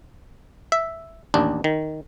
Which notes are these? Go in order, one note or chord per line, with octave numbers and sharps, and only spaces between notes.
E5
A1 D#2 D4
D#3